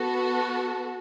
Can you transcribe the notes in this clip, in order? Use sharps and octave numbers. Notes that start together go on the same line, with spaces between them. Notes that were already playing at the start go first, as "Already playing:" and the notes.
Already playing: B3 F#4 A4